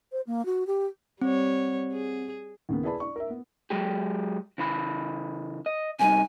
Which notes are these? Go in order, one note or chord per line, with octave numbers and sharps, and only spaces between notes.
C5
A#3
F#4
G4
G3 C4 C#5
G#4
D#2 C#3 A#3 B3
E4 G#4 B4 D5 A5 B5
D5 C#6
A#4 E5
B3
F#3 G#3 G4
C#3 E3 B5
D#5
C3 G3 D#4 G#5